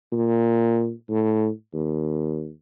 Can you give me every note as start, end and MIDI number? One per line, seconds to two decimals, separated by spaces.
0.12 0.91 46
1.09 1.49 45
1.73 2.51 39